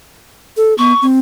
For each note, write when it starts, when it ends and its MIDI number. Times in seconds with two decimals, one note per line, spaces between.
0.57 0.74 69
0.78 0.93 59
0.78 1.05 85
1.02 1.19 60